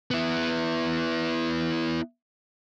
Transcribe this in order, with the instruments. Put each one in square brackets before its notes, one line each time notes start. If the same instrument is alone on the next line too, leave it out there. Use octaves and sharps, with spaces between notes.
[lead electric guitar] B3 E4